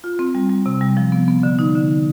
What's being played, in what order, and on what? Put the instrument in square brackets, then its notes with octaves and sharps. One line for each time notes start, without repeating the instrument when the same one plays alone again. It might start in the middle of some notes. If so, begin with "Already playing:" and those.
[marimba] F4
C4
G3
G3
C3
G3
F3
B3
B3
D3
D#4
D3